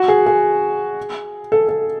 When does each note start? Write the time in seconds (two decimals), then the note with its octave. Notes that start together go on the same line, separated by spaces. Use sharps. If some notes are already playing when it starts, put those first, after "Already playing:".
Already playing: F#4
0.08 G#4
0.26 G#4
1.52 A4
1.69 A4